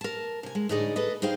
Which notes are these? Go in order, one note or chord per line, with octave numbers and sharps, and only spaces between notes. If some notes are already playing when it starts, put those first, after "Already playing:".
A#4 A5
C3 G#5
G#3
D2 A2 D#4 G#4 D5 D#5
A4 B4 D#5
D#4 G#4 C5 F5 G5